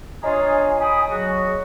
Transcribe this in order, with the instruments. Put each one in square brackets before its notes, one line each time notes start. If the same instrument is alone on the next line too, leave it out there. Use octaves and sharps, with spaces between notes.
[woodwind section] D4 F4 G#4 [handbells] C#5 D#5 A#5 [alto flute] G#5
[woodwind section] G5 B5 D#6
[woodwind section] F#3 F#4 [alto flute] G#4